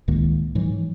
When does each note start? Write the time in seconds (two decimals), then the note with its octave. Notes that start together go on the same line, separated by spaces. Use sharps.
0.08 C#2 A2 D#3 A#3
0.55 G#2 E3 F#3